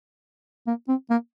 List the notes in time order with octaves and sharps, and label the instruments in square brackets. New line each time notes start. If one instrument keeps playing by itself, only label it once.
[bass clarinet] A#3
C4
A#3